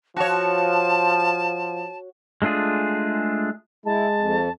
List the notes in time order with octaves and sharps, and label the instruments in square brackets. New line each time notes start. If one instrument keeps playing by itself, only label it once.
[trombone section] F3 [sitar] F#4 C#5 [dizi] A5
[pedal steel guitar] G#3 A3 D4 F4 G#4
[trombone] G#3 [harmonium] E4 [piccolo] A5
[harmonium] F2